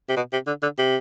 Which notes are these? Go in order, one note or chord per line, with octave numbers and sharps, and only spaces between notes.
C3
B2
C3
D3
D3
C3